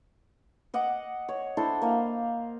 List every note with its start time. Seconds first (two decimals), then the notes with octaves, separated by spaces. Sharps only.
0.74 D#5 F#5 D6
1.28 C#5
1.57 D4 E4 A4 C5
1.82 A#3 D#5 F5